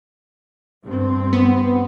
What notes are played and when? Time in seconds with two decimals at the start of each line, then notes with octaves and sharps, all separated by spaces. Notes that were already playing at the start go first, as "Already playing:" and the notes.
0.85 G2 C4
1.33 B3